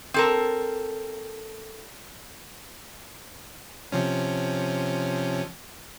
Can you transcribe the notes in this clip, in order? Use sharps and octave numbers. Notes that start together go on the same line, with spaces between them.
C4 A4 A#4
C3 F3 C#4